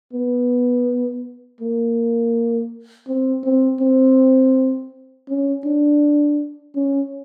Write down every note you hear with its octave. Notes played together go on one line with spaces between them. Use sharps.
B3
A#3
C4
C4
C4
C#4
D4
C#4